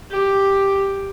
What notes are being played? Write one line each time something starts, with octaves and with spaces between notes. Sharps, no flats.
G4